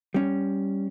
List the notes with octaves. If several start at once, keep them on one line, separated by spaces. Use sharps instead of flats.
G3 C#4